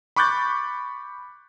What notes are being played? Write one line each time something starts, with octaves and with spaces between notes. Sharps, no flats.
B5 C#6 D6 F#6 G6 A6